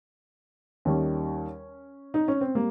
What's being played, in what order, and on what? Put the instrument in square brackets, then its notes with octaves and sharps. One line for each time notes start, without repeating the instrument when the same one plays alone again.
[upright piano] D#2 D#3 G3 C#4
D#4
C#4
C4
G3 A#3